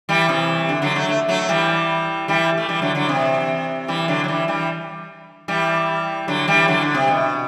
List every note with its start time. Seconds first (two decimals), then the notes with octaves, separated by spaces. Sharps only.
0.09 E3 G3
0.29 C3 E3
0.69 D3
0.82 D3 F#3
0.95 F#3 A3
1.09 A3
1.29 F#3 A3
1.42 F#3
1.49 E3 G3
2.28 E3 G3
2.57 A3
2.69 E3 G3
2.82 D3 F#3
2.95 D3 F#3
3.09 C3 E3
3.88 E3 G3
4.08 D3 F#3
4.24 F#3
4.28 E3 G3
4.48 E3 G3
5.48 E3 G3
6.28 D3 F#3
6.48 E3 G3
6.68 D3 F#3
6.81 D3
6.94 C3
7.08 B2